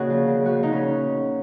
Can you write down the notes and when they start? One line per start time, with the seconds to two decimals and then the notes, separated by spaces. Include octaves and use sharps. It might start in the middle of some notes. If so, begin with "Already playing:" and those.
Already playing: A#2 C#3 F#4 G#4 C#5 D#5
0.10 F3
0.27 C#3
0.46 F3 F#4
0.63 C#3 D#4
0.73 C#4